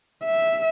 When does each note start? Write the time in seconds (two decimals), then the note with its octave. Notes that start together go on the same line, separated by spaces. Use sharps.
0.24 E5